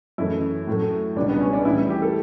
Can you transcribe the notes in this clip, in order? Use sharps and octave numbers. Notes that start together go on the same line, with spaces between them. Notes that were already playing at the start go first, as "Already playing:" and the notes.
F#2 E3 A3 E4
A2 F#3 A3
C#2 B2 G3 D4
B3
C#4
D4
A2 E3 G3 E4
E4
G4
A4